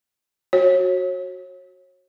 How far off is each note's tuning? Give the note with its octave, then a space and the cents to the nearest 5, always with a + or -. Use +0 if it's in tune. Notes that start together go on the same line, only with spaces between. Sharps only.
F#4 +0 C#5 -35